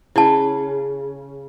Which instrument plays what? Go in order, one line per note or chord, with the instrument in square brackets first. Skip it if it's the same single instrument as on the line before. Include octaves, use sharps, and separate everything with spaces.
[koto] C#3 [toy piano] E4 A5